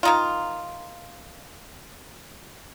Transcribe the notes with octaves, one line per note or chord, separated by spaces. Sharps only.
D#3 D#4 F4